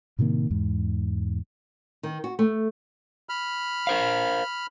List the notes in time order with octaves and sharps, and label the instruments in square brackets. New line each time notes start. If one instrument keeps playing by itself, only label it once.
[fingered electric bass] A2 C3 D#3 A#3
E2 G#2
[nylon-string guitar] D#3
F#4
A3
[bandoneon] B5 F6
[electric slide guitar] A#4 C5 F5